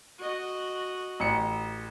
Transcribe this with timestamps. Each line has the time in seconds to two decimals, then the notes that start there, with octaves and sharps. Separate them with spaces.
0.19 F#4 D#5
1.20 A1 C#7